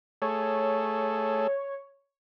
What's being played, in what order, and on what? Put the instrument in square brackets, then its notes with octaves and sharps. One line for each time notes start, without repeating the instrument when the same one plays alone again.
[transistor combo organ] A3 G#4 A4 [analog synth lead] C#5